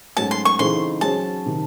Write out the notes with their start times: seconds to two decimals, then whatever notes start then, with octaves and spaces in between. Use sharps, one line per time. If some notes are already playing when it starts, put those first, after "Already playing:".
0.17 G#2 F#3 A3 C#4 F#4 A5
0.31 C6
0.45 C#6
0.59 C#3 E3 C4 D#4 A4 C6
1.01 F#3 C#4 G#4 C5 A5
1.46 C3 D#3